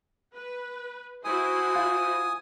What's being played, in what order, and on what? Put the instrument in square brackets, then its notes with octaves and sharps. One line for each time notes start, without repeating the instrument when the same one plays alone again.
[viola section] B4
[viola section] E4 F#4 C5 [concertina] G#5 D#6
[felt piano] F4